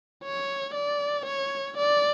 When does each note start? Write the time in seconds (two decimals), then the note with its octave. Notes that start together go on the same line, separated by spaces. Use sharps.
0.24 C#5
0.75 D5
1.26 C#5
1.78 D5